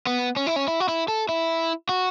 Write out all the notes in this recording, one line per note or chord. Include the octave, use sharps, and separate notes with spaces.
B3
C#4
E4
C#4
E4
F#4
E4
A4
E4
F#4